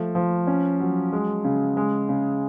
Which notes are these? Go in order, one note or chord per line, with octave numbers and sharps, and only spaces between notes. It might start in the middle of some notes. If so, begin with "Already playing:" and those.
Already playing: F3 A3
F3
C#4
F#3
G#3
C#3
G#3
C#3